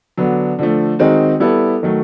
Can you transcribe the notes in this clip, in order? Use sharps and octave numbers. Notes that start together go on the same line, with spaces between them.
D3 F#3 B3 D4
D3 F3 A3
D#3 G#3 C4 D#4 F#4
G3 B3 E4 A4
D#3 F#3 A3